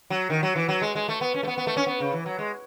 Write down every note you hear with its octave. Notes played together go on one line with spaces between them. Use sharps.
F#3
D#3
F#3
E3
F#3
G#3
G#3
A3
B3
C#4
A3
B3
B3
A3
C#4
B3
C#3
E3
F#3
G#3